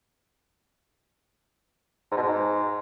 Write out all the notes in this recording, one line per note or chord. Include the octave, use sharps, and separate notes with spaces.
G#2
B2
G#2